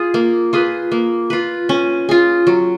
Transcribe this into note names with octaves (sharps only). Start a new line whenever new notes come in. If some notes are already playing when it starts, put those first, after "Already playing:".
Already playing: F4 G#4
A#3
F4 G#4 B4
A#3
F4 B4
C#4
F4 G#4
F#3